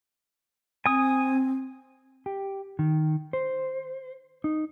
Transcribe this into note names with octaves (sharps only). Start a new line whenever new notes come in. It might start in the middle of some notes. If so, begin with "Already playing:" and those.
C4 G#5 D#6
G4
D#3
C5
D#4